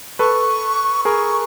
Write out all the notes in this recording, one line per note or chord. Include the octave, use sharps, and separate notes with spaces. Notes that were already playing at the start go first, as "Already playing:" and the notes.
A4 B4 C#6
G#4 A#4 C#6